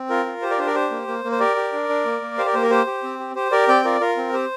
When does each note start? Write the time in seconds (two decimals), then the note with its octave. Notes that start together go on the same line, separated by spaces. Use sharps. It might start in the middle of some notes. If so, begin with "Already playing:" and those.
Already playing: C4
0.10 F4 A#4
0.26 F4
0.42 G4 C5
0.50 A#4 D5
0.58 D4 C5
0.67 A#4 D5
0.75 G4 C5
0.91 A#3
1.08 A#3
1.24 A#3
1.32 C5
1.40 G4 A#4 D5
1.56 G4
1.73 D4
1.89 D4
2.05 A#3
2.22 A#3
2.38 G4 C5 F5
2.46 A#4 D5
2.54 A#3 C5
2.62 A#4
2.70 G4 C5
2.87 G4
3.03 C4
3.19 G4
3.35 G4 C5
3.52 G4 A#4 D5
3.68 C4 D5 G5
3.85 F4 A#4 D5
4.01 F4 A#4
4.17 C4
4.33 G4 C5